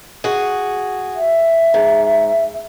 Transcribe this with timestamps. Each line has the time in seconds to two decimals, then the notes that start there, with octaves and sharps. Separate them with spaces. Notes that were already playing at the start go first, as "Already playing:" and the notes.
0.24 F#4 G#4
1.16 E5
1.74 G#2